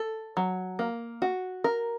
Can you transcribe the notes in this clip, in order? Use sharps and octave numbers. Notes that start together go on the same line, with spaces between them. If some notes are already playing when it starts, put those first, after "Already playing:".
Already playing: A4
F#3
A#3
F#4
A#4